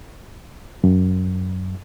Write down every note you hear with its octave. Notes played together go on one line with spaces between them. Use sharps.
F#2